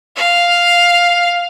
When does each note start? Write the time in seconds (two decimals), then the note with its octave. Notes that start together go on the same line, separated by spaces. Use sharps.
0.16 F5